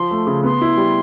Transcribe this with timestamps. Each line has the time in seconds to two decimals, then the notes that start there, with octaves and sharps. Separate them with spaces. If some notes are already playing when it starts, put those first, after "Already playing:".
Already playing: F3 C6
0.11 A3
0.27 C#3
0.44 B3 C6
0.61 E4
0.77 G3